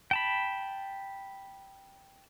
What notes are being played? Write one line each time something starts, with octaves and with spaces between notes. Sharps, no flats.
G5 A5 B5